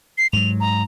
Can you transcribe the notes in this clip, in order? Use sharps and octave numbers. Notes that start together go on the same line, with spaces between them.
C7
G#2 F#3 F7
A#5